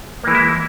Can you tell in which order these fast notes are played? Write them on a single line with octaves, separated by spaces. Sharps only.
A#3 E3 G#3 E4